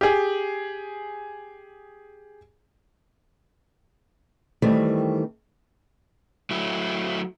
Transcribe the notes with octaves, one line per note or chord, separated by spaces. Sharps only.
G4 G#4
D#3 E3 G3 A3 C4
F#3 A3 E4